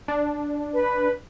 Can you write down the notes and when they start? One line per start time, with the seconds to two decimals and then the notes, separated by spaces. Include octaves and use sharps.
0.08 D4
0.73 B4